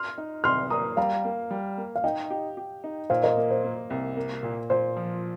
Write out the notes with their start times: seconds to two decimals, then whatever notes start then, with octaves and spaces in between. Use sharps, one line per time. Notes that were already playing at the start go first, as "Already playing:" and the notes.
Already playing: C6 F6
0.18 D#4
0.44 C2 C6 F6
0.70 A#3 A#5 D#6
0.97 G3 F5 A#5
1.24 A#3
1.51 G3
1.77 A#3
1.96 F5
2.04 D#4 D#5 G5
2.30 G4
2.57 G4
2.84 D#4
3.10 A#2 C5 F5
3.24 A#4 D#5
3.37 A#3
3.51 C5
3.64 A#3
3.90 C2
4.17 A#3
4.43 A#2
4.70 A#2 C5
4.96 F3